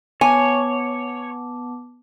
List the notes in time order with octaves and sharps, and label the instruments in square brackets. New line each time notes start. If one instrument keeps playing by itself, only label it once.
[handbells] B3 A5 D6 [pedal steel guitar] C#5 [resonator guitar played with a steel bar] G#5